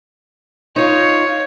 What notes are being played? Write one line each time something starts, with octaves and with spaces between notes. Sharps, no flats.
D#4 F4 C#5